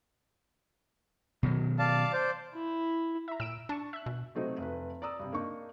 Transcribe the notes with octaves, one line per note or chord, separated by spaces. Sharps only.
B2 D#3 F#3
D5 F5 A5
C5 D5
E4
E5 A#5
A#2 E6 D7 E7
D4 A5 C#6
E5 F#6
B2
C3 F#3 A3 C4 D#4
F1 B4
D5 A#5 D#6 E6
G2 C3
A#3 D4 D#4 C#6